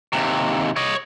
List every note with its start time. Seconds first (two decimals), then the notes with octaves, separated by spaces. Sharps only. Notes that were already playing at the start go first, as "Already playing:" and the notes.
0.13 D#2 C3
0.76 C#5 D#5